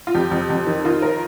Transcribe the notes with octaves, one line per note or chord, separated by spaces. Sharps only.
F4
F2 G4
F2
F2
D#3
D#3 F4
A#4